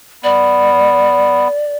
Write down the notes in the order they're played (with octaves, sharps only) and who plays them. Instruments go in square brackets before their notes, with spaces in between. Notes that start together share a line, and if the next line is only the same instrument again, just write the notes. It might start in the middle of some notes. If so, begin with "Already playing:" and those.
[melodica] B3 [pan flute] D5